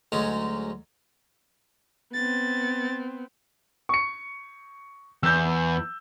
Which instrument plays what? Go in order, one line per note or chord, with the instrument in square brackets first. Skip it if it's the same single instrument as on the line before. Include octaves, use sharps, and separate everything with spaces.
[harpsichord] D2 F#3 G#3 C#4 D#4
[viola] B3 C4 [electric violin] A6
[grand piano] C#6 C#7
[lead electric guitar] E2 [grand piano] E6 G6